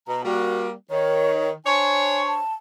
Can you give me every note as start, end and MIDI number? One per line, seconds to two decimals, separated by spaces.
0.07 0.21 47
0.07 0.22 82
0.24 0.71 55
0.24 0.71 58
0.24 0.67 66
0.90 1.53 51
0.90 1.50 73
1.66 2.38 62
1.66 2.38 72
1.66 2.38 73
1.66 2.22 80
2.27 2.54 81